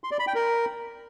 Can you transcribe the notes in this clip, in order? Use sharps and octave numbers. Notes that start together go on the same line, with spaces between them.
C6
D5
B5
G5
A#4